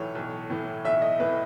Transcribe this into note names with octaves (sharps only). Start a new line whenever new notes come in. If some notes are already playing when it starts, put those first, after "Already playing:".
Already playing: B1 A2 E3 C#5
B1
A2 E3
B1 E5
D#5
A2 E3 B4